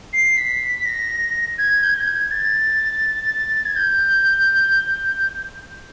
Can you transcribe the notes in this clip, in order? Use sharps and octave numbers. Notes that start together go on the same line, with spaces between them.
C7
B6
A#6
G#6
G6
G#6
G6
G#6
A6
A6
G#6
G6